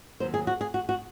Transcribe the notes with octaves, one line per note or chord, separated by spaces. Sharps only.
D#2 D#3 F#3 C5
G#4
F#4
G#4
F#4
F#4